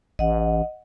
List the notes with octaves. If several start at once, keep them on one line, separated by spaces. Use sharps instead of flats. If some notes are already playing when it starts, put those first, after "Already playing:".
A1 D#5 F#5